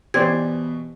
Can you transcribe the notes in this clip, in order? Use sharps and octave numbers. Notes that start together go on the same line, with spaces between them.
B2 E3 G4 C5 D5 G#6